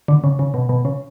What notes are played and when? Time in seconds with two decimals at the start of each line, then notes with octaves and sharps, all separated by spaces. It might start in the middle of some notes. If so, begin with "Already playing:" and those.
0.08 D3
0.24 C#3
0.39 C#3
0.54 B2
0.69 B2
0.85 C#3